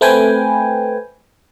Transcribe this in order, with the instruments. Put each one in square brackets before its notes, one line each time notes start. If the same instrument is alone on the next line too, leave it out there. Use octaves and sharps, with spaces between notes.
[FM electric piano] A3 C4 B4 G5 G#5